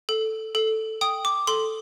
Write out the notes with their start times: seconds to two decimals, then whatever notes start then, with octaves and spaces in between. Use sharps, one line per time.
0.09 A4
0.55 A4
1.01 G5 D#6
1.25 D6
1.47 A4 C6